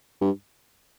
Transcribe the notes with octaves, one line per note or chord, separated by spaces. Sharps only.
G2